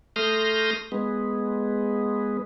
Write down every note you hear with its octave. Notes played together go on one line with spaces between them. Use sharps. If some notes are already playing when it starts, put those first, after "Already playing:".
A3 C6 D#6 F6 G6 A#6
G#3 B3